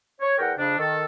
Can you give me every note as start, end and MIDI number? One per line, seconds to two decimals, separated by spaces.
0.21 0.37 73
0.39 0.53 40
0.39 0.53 70
0.39 0.53 78
0.39 0.53 79
0.58 0.78 41
0.58 0.78 49
0.58 0.78 62
0.78 1.05 51
0.78 1.05 69